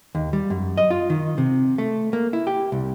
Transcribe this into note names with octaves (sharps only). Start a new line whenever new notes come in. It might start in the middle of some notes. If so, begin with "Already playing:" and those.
D#2
G3
F#2
D#5
F4
D#3
C3
A3
A#3
E4
G4
C2